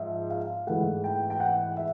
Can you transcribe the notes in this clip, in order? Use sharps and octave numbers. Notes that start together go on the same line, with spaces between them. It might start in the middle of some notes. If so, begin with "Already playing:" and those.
Already playing: G#2 F3 E5
F5
G#2 E3 A3 F#5
G5
G5
F#5
E5